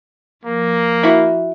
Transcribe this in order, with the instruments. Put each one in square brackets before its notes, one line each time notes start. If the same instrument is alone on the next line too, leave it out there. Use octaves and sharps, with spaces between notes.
[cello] F3 [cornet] A#3
[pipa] E4 F#4